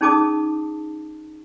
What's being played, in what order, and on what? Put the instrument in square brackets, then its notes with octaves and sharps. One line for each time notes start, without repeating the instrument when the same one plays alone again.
[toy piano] C#4 D#4 G#4 A5 D6 D#6